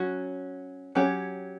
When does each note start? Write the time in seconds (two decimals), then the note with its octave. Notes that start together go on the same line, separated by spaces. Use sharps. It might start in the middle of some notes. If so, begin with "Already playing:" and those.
Already playing: F#3 C#4 F#4
0.95 F#3 C#4 G4 C#5